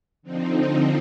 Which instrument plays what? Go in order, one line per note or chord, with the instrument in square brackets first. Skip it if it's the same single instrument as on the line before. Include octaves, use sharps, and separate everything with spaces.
[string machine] D3 F3 C4 D#4